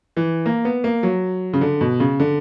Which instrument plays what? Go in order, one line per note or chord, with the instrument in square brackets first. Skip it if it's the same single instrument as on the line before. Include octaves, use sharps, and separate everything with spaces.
[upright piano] E3
A#3
B3
A#3
F#3
C#3
D3
B2
C#3
D3